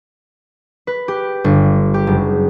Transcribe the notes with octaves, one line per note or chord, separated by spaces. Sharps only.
B4
G4
G1
G4
F#1